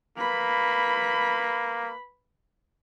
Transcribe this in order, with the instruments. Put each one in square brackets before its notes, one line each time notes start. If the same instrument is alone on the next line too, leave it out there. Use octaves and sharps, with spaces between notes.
[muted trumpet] A#3 [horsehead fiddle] B4 B5